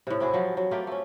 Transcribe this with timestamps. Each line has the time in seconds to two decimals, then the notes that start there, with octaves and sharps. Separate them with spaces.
0.07 A2 C3
0.20 C4 E4 F#4 G#4
0.34 F3 F#3
0.57 F#3
0.71 A3 A#3 F4 G4
0.87 A3 C#4